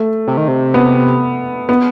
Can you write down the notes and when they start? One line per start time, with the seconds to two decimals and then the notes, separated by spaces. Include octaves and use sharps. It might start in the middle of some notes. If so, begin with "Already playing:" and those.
Already playing: A3
0.27 C3
0.37 D#3
0.48 C3
0.74 B3
1.69 B3